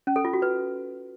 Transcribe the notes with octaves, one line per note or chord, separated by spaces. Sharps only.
C#4
A4
F4
F#4
B4